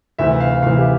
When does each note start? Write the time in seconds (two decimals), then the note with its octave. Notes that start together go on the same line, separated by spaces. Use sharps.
0.19 D2 C3 E3 E5
0.40 F5
0.62 D2 C3 E3 F5
0.77 G4